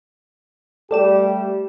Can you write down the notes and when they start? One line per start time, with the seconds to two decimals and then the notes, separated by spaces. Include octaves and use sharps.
0.91 G3 A3 G4 A4 D5 E7